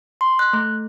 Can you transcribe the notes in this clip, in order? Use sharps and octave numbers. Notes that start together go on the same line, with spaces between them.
C6
F#6
A3